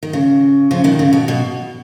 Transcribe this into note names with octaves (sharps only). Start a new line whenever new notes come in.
D#3
C#3
C#3 F3
B2 D#3
C#3
B2
B2